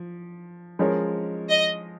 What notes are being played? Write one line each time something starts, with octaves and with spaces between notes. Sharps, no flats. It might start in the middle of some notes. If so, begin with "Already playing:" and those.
Already playing: F3
F3 G#3 C#4 A#4 C#5
D#5